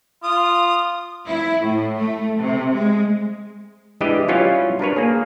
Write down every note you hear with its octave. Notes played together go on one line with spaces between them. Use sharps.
F4 D#6
E4
A2
A3
C3
G#3
E3 G#3 D4 G4 B4 D#5
F#3 G3 C#4 E4 F4 C#5
D4 A#4 B4 C#5
A#3 G#4